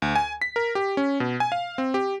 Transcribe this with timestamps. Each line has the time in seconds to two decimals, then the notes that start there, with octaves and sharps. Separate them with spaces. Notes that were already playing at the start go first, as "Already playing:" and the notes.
0.02 D2
0.15 G#5
0.42 B6
0.56 A#4
0.75 G4
0.97 C#4
1.20 B2
1.40 G#5
1.52 F5
1.78 C4
1.94 G4